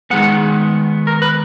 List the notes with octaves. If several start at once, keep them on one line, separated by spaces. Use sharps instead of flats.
D#3 G#3 B3 F#5
A#4
B4